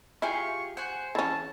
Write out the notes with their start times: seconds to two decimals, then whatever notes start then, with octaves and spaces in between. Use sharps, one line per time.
0.22 E4 F4 G4 G#4 C#6
0.77 C5 F#5 G#5
1.15 E3 C#4 A5